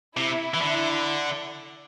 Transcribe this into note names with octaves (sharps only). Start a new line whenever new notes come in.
C3 E4
E3
D3